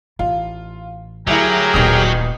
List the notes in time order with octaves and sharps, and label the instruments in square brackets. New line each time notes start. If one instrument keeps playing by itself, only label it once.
[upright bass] A1 [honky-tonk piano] F4
[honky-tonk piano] D2 E4 [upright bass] D3 [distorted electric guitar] F#3 [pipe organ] G4 G#4 A#4
[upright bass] D1 A#2 [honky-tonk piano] A1 D#3 D#6